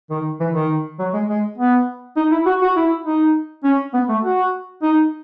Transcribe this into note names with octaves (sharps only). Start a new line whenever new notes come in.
D#3
E3
D#3
F#3
G#3
G#3
B3
D#4
E4
F#4
F#4
E4
D#4
C#4
B3
A3
F#4
D#4